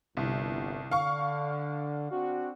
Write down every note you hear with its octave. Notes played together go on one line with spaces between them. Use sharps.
G1 C2
D3 F5 C#6
C4 D4 F#4